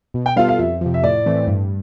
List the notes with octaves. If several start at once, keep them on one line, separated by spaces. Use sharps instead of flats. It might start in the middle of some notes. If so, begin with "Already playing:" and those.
B2
G5
G3 B3 F4 A4 F5
F5
F2 E5
C3 F3
E5
A2 D5
E3 A3 C4
G2